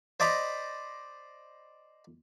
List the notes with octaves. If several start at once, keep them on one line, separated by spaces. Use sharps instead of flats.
C5 D5 D#5 A#5 B5